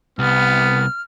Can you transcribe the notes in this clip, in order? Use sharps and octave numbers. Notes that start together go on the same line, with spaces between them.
C2 B3 F6